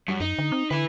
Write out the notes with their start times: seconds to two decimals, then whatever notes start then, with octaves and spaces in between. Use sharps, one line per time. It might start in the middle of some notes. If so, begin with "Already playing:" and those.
0.08 F#2 G3
0.20 F#2 D#4
0.38 D3
0.52 C4
0.71 D3 E4 B4